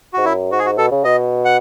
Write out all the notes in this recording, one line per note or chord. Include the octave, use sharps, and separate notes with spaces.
G#2 F#4
F#2 E4
G#2 F#4
G#4
F#4
B2 A4
C#3
B2 D#5
F#5